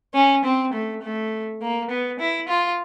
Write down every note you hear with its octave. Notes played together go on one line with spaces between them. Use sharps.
C#4
C4
A3
A3
A#3
B3
E4
F4